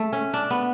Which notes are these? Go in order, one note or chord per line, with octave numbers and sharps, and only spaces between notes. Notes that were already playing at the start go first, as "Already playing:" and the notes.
Already playing: A3
C#4
D4
B3